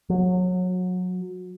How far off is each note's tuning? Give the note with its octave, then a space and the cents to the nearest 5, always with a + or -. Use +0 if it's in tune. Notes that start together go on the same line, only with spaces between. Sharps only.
F#3 -25